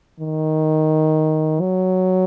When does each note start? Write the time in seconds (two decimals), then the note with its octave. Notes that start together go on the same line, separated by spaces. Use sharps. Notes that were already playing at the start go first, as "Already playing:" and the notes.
0.20 D#3
1.61 F#3